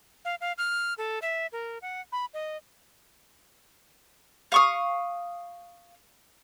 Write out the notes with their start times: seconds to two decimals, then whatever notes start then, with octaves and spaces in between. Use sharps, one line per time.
0.25 F5
0.41 F5
0.58 F6
0.98 A4
1.22 E5
1.52 A#4
1.82 F#5
2.12 B5
2.34 D#5
4.52 F5 C#6 D#6